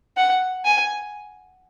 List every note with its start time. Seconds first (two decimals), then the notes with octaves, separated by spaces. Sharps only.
0.17 F#5
0.65 G#5